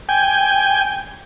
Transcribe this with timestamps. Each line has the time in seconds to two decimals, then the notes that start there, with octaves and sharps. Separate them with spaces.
0.09 G5 G#5